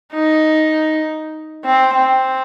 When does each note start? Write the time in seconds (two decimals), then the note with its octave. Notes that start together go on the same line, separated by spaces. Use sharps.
0.14 D#4
1.65 C4
1.95 C4